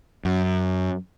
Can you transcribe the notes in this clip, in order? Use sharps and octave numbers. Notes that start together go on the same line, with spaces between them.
F#2